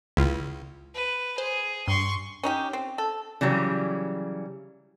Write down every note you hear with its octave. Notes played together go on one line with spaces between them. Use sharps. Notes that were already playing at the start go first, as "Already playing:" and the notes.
C#2 E4 F4
B4
G#4 C5
G2 C6 C#6
C#4 D#4 G4
C4
A4
C#3 E3 F#3 G3